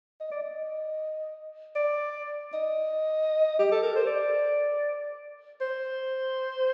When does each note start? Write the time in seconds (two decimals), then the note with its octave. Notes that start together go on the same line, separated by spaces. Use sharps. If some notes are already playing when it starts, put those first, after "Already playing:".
0.20 D#5
0.31 D5
0.42 D#5
1.76 D5
2.53 D#5
3.59 G4
3.71 A4
3.83 A#4
3.95 C5
4.07 D5
5.61 C5